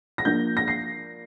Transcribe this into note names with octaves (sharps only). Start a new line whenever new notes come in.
A#6
F3 A#3 D4 G6
A#6
C7